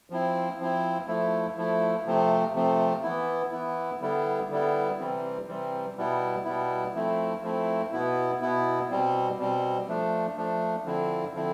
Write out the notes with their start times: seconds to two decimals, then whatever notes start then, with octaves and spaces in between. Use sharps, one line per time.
0.10 F3 C4 E4
0.59 F3 C4 E4
1.07 F3 A3 E4
1.56 F3 A3 E4
2.05 C3 F3 A3 C4
2.54 C3 F3 A3 C4
3.03 E3 B3 E4
3.51 E3 B3 E4
4.01 D3 G3 B3 E4
4.50 D3 G3 B3 E4
4.99 C3 E3 G3 C4
5.47 C3 E3 G3 C4
5.96 B2 G3 B3 E4
6.45 B2 G3 B3 E4
6.95 F3 A3 C4 E4
7.42 F3 A3 C4 E4
7.93 B2 B3 E4
8.41 B2 B3 E4
8.90 B2 G3 C4
9.38 B2 G3 C4
9.88 F3 A3 D4
10.37 F3 A3 D4
10.85 D3 F3 C4 E4
11.34 D3 F3 C4 E4